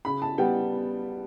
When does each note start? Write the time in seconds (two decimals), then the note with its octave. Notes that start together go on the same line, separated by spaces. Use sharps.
0.05 C#3 B5
0.22 A5
0.38 G3 B3 G5